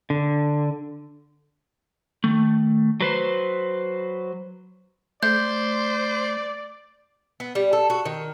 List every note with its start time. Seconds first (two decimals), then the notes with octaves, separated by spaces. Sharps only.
0.10 D3
2.24 D#3 A3
3.01 F#3 B4 C5
5.23 A3 C5 D5 G6
7.40 B3
7.55 G3
7.73 A4
7.90 F#4
8.05 D#3